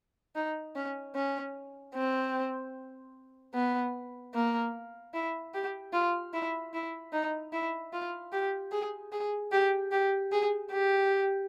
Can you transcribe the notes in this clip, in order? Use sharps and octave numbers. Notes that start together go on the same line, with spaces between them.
D#4
C#4
C#4
C4
B3
A#3
E4
G4
F4
E4
E4
D#4
E4
F4
G4
G#4
G#4
G4
G4
G#4
G4